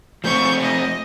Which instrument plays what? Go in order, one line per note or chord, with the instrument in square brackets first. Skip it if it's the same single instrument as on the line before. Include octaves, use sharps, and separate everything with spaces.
[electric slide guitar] F3 A3 C4 [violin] C#6 G6
[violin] D#5